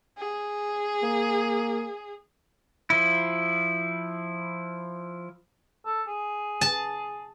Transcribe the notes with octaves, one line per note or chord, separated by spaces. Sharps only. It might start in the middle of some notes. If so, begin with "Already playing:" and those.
G#4
A#3
F3 E4
A4
G#4
A5